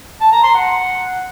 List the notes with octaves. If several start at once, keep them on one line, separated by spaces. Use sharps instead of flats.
A5
A#5
C6
F#5